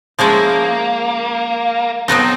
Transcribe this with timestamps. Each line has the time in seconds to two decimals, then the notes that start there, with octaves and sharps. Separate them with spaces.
0.19 F3 G#3 A#3 C#4 E4 G#4
2.08 B2 F#3 B3 C4 D#4